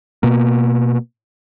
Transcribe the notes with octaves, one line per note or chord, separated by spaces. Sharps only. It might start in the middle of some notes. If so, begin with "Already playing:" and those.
B2 A#3